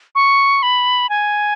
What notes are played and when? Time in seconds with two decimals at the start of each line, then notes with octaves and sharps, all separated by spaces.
0.15 C#6
0.63 B5
1.09 G#5